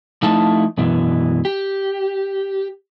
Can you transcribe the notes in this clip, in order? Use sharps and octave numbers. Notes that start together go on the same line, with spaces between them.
F3 A3 D#4 E4 A5
F#2 B2 E3
G4